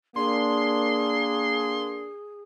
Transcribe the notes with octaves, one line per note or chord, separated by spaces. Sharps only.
A#3 D4 G#4 C6